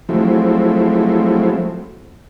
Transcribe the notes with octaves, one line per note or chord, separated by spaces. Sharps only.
F3 F#3 G#3 A3 C4 E4